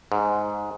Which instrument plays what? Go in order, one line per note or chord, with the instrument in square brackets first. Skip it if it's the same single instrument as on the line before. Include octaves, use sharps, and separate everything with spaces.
[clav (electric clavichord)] G#2